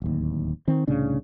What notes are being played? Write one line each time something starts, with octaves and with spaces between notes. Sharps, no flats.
D1 D#2
D#3 C4
C2 A2 C#3 D4